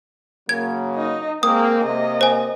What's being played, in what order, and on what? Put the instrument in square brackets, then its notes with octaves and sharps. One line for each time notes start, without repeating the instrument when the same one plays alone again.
[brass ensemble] C#3 F#3 A#3 [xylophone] G#6
[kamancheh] D#4 D#5
[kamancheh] G#3 C4 [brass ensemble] A#3 [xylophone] D#6
[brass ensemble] C3 A#3 [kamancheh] D#5
[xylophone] C5 G#5